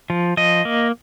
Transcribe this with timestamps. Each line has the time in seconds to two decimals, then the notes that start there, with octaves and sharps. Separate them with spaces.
0.10 F3
0.37 F3 D#5
0.65 A#3